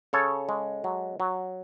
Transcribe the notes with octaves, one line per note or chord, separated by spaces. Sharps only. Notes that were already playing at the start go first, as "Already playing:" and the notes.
C#3 A4 C#5
G#3
F#3
F#3